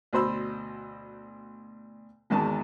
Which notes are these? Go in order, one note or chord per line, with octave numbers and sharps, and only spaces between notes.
D2 B2 C5 B5 E6
G#1 E2 G#2 D#3 A5